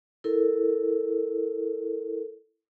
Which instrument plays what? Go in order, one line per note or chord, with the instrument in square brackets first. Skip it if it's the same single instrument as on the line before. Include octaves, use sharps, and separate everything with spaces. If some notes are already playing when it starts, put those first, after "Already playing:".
[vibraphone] E4 A4 A#4